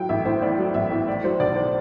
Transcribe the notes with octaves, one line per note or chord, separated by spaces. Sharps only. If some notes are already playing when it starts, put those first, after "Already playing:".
Already playing: A2 F#3 G5
A1 E5
A1 C5
A2 D5
F#3
A1 E5
A1
A2 D5
F#3 C5
B1 D5
C5